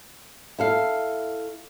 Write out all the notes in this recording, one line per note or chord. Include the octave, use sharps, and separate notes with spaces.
E4 A4 F5